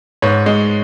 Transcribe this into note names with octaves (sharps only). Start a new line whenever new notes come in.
G#2 B4 C#5
G#3